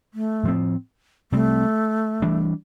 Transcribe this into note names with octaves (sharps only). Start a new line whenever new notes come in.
A3
A2 F3 C4
C3 G3 A3 C4
E3 G3 D4